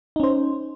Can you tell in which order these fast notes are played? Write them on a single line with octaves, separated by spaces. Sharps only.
D#4 C#4 C5